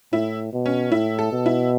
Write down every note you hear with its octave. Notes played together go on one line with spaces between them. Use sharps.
A2 E4
B2
C#4
A2 E4
A4
B2
E4